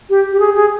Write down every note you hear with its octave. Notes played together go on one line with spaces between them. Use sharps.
G4
G4
G#4
G#4